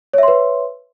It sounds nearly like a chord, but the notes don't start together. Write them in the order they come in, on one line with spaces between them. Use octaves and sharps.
C#5 E5 C6 B4